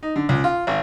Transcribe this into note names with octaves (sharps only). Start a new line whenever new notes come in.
D#4
D3
C#2
F4
G#1